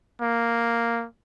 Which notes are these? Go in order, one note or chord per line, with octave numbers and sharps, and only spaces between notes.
A#3